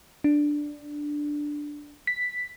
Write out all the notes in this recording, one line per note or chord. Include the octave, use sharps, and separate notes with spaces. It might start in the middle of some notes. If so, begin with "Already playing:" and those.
D4
B6